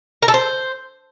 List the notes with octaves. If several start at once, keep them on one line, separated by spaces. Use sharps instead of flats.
A#4
A4
C5